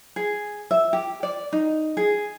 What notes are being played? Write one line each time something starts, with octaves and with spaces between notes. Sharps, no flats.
G#4
E5
G4
D5
D#4
G#4